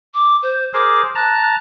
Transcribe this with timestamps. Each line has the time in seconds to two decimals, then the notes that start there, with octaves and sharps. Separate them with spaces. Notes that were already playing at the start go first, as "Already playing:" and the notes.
0.14 D6
0.42 C5
0.73 G#4 A#4 C5 D6
1.15 A5 A#5 F#6